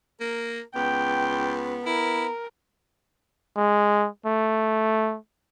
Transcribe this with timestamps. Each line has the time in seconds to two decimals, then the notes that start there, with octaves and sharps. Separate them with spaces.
0.21 A#3 A#4
0.76 C#2 B3 G5
1.86 E4 A#4
3.56 G#3
4.26 A3